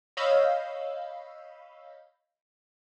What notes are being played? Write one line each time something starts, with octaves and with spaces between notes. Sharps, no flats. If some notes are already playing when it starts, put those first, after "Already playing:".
C#5 D#5 F5 B5 E6 G6